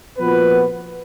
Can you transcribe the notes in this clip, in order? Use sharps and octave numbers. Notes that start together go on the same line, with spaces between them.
A#2 F3 B3 F#4 B4